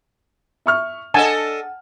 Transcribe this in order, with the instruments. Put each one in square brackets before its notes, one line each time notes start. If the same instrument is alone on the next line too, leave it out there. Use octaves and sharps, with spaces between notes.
[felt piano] E5 C#6 F6
[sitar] D4 A4 D#5 [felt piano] F#5 [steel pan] G#5 A5